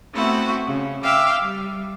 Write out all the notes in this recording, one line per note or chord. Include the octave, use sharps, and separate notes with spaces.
A3 B3 C4 E4 F#4
C#3
E5 F5 G5 D6 E6
G3